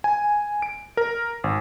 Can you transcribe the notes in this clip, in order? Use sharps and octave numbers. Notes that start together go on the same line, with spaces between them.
G#5
D7
A#4
G#1